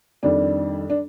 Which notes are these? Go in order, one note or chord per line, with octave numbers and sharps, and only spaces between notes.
F2 D#3 G3 D4
D4